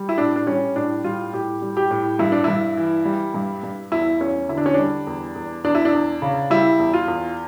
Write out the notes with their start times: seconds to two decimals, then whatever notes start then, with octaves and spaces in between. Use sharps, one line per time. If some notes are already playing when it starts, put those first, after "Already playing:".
Already playing: G3
0.09 E4
0.18 A2 D4
0.36 D4
0.47 G3 C#4
0.76 A2 D4
1.04 G3 F4
1.33 A2 G4
1.62 G3
1.77 G4
1.91 A2
2.19 G2 E4
2.32 D4
2.44 G2 E4
2.77 E3
3.05 G3
3.34 G2
3.63 G2
3.92 E2 E4
4.21 E2 C#4
4.49 D3 E4
4.58 D4
4.66 C#4
4.74 G3 D4
5.07 E2
5.35 E2
5.64 E2 D4
5.75 E4
5.85 D4
5.93 E2
6.22 C#3
6.50 G3 E4
6.79 E2
6.94 F4
7.08 E2